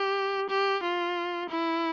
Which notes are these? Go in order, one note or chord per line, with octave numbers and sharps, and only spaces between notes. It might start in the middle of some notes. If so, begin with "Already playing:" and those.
Already playing: G4
G4
F4
E4